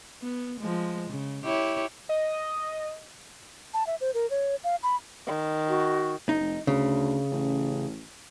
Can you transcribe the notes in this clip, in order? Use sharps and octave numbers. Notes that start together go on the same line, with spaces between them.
B3
F3 G#3
C#3
E4 G4 C#5
D#5
A5
E5
C5
A#4
C#5
F5
B5
D#3
F#4
F#1 D#4
F1
D2 C#3
A1